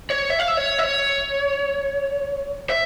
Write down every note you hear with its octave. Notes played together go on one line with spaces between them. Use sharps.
C#5
E5
F5
E5
C#5
E5
C#5
E5